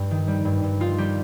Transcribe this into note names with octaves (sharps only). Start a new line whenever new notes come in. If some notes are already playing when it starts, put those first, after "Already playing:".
Already playing: G2 G3
D#3
G3
G2
G2
D#3 F4
G3 G4